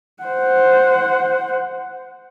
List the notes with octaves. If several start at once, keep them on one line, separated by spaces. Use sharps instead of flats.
C5 F#5